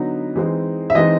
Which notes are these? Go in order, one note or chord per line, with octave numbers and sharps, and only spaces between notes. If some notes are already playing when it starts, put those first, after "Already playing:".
Already playing: D3 F#3 B3 D#4
E3 G#3 C4 D#4
E5
E3 G#3 C4 D#4 D#5